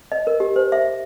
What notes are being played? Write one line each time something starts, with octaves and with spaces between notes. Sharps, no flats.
D#5
A#4
G4
C5
E5